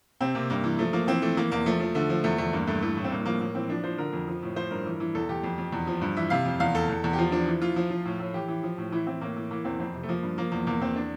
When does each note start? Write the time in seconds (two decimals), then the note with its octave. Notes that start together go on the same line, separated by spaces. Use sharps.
0.21 C3 C4
0.35 C3 A#3
0.50 G2 A#3
0.64 E3
0.79 F3 A3
0.93 F3 A#3
1.08 E3 C4
1.22 E3 A3
1.37 E3 A#3
1.52 E2 A#3
1.66 F3 A3
1.80 F3
1.95 D3 A3
2.09 F3
2.24 E2 A3
2.38 E2 A3
2.53 G2 A#3
2.67 G2 A3
2.82 E3 A3
2.97 A2
3.04 C4
3.11 G2 A#3
3.25 F3 A#3
3.40 A2 A#3
3.55 E3 C4
3.69 F3 D4
3.84 F3 C5
3.98 D3 A#4
4.13 F2
4.28 F3
4.43 A2
4.56 F3 C5
4.71 G2 A#4
4.86 E3
5.00 E3
5.15 E2 A4
5.29 E2 G4
5.43 F2
5.58 F2
5.72 E2
5.87 F3
6.02 G2
6.17 E3 E5
6.30 C3 F5
6.45 F2
6.60 E2 F5
6.75 E2 A4
6.89 E2
7.04 E2
7.13 G4
7.18 F3 F4
7.32 F3 D4
7.47 E3
7.62 E3 F4
7.76 F3
7.90 F3
8.05 A2
8.20 A2
8.34 E3 G4
8.48 E3
8.63 F3
8.78 A2
8.92 E3 E4
9.07 E3 C4
9.21 A2 A#3
9.36 E3
9.51 E3 A#3
9.65 E2 C4
9.80 F2 C4
9.94 C3
10.03 A3
10.09 F3 A#3
10.23 G2
10.38 F3 A#3
10.52 E2 A#3
10.67 E2 A#3
10.81 E2 C4
10.96 D4